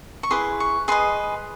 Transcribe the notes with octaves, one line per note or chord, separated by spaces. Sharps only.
C#6
E4 G#4 B4 C6
C#6
G#4 B4 D#5 C6